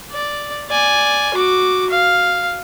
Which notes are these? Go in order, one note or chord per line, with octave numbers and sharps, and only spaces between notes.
D5
D5 G#5
F#4 D6
F5